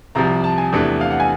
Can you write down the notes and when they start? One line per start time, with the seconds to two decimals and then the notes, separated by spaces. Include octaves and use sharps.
0.15 C2 C3 F3 A#5
0.44 A5
0.58 G#5
0.73 E2 C3 E3 A3 D4
1.01 F5
1.11 F#5
1.20 G#5